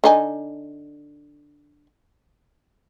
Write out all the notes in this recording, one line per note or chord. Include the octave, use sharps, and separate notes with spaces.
D3 D#4 G#5